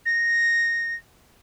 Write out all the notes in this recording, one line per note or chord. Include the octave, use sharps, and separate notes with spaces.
A#6